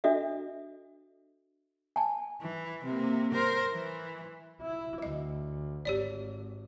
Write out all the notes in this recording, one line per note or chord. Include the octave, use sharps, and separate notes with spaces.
D4 F#4 A4 D#5 E5
G#5 A5
E3
C3 A#3
A#4 C5
E3
E4
D2 D#5
G#1 G4 C#5 D5